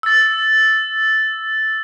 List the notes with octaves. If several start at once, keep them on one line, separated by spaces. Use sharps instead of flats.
E6 A6